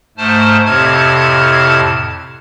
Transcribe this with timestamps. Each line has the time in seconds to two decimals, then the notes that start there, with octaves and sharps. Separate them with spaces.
0.18 G#2 A3 C5 A5 F6
0.66 F2 A2 C3 A5 F6 G#6